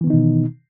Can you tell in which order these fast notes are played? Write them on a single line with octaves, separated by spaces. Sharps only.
E3 B3 D#3 D#4 B2